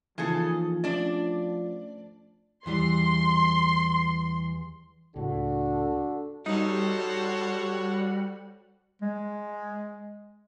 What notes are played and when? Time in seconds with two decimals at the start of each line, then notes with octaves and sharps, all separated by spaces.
0.18 C#3 E3 F3 A#3 D#4 G#4 A4
0.84 A3 C#4 D4 D5
2.66 E2 E3 G3 C6
5.16 C#2 A2 D4 F#4 A4
6.46 G3 D#4 F#4 A4 C5 C#5
9.02 G#3